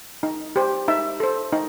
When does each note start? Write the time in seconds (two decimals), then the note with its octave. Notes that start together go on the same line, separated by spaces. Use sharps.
0.23 D#4
0.56 G4 C5
0.88 D#4 E5
1.20 A4 C5
1.53 D#4